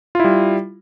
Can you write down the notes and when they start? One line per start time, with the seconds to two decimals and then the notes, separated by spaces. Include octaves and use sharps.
0.15 F4
0.20 E4
0.24 G3